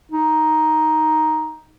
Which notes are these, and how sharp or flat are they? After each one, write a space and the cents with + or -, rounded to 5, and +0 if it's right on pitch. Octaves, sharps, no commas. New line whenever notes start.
D#4 +5